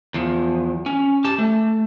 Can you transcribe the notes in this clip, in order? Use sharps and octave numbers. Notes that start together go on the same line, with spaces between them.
E2 F3
C#4
G4 A5
A3